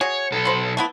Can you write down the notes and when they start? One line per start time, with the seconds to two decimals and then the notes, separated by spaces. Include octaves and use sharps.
0.01 F#4 G#4 C#5
0.32 B1 A4
0.45 C5 B5
0.77 A3 B3 E4